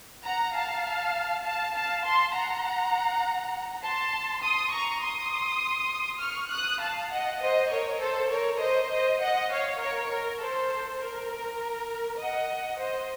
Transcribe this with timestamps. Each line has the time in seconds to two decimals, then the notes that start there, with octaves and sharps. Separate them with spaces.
0.23 F#5 A#5
0.53 F5 A5
1.43 F5 A5
1.73 F5 A5
2.02 A5 C6
2.33 F#5 A#5
3.83 A5 C6
4.42 C6 D#6
4.72 A#5 C#6
5.02 C6 D#6
6.22 C#6 F6
6.52 D#6 F#6
6.81 F5 A5
7.12 D#5 F#5
7.41 C5 D#5
7.71 A#4 C#5
8.01 A4 C5
8.31 A#4 C#5
8.61 C5 D#5
8.91 C5 D#5
9.21 D#5 F#5
9.51 C#5 F5
9.80 A#4 C#5
10.11 A#4
10.41 A4 C5
11.01 A#4
12.20 D#5 F#5
12.80 C5 D#5